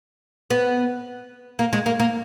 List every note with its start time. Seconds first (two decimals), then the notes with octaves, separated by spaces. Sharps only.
0.50 B3
1.59 A#3
1.73 G#3
1.86 A#3
2.00 A#3